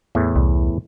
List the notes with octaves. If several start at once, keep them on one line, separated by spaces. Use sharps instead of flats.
E2 A2 E3
C2